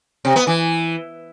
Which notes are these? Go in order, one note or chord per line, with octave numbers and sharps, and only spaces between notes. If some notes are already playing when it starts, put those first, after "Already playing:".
C3
B3
E3